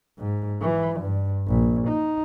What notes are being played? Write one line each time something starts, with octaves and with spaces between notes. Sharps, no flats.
G#2
E3
G2
A#1
D#4